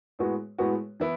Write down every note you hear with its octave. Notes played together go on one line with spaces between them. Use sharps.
A2 G#3 B3 F#4
A2 G#3 B3 F#4
E3 B3 E4